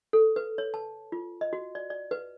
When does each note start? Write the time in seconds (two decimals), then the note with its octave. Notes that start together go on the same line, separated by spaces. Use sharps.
0.13 A4
0.36 B4
0.58 C#5
0.74 A5
1.12 F4
1.41 D#5
1.53 F#4
1.75 D5
1.90 D5
2.11 B4